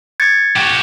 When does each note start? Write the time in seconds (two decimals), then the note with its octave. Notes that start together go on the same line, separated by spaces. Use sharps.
0.20 G#6 A6 C#7
0.56 F#4 G4